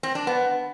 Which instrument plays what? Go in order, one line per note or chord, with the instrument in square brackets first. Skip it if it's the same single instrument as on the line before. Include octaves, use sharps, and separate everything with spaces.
[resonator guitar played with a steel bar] C4
D4
B3